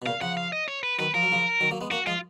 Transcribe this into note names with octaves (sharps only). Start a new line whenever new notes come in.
B2
A#2 C#3 F5
C#3 F3 F#5
F5
D#5
C#5
B4
D#3 F#3 B4
F3 A#4
F#3
C#3 F3
D#3 F#3
F#3 A#3
G#3 B3
A#3 C#4 F#4
F3 G#3 F4